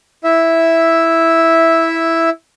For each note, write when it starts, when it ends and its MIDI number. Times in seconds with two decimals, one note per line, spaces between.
0.24 2.30 64
0.24 2.30 76